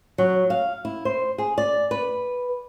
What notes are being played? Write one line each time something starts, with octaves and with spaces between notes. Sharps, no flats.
F#3
F5
E4
C5
G#4
D5
B4